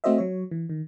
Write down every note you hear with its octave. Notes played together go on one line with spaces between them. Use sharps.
A3 C4 F#4 C5 D#5 E5
F#3 C#5
E3
D#3